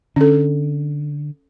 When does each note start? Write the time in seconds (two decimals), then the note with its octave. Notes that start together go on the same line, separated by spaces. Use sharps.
0.16 D3 C#4 A4